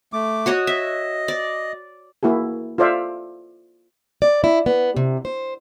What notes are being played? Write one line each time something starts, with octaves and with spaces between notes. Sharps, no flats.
A3 D6
F#4 C#5 D#5
D#5 E5
D5
A#3 E4 F#4 G#4
F4 A4 C5 D5 E5 F5
D5
E4
B3
C3
C5